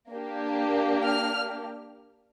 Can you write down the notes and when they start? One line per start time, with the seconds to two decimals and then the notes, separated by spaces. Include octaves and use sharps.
0.10 A#3 D4 G4
1.04 F6